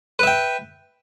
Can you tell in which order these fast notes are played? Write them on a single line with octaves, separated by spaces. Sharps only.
B4 E5 G5